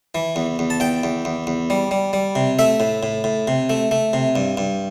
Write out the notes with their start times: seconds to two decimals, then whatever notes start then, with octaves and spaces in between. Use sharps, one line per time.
0.15 E3
0.36 E2
0.59 E2
0.70 A5
0.80 E2 G5
1.04 E2
1.25 E2
1.47 E2
1.70 G3
1.91 G3
2.13 G3
2.35 C3
2.59 A3 E5
2.80 A2
3.03 A2
3.24 A2
3.48 C3
3.70 A3
3.91 A3
4.13 C3
4.36 G2
4.57 G2